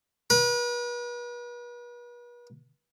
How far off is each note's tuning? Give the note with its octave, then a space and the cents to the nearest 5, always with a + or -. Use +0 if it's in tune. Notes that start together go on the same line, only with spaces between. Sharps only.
B4 -40